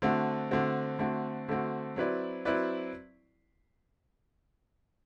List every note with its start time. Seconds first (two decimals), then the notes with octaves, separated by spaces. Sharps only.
0.02 D3 A3 C4 F#4
0.51 D3 A3 C4 F#4
0.99 D3 A3 C4 F#4
1.49 D3 A3 C4 F#4
1.96 F#3 C4 E4 B4 D5
2.45 F#3 C4 E4 B4 D5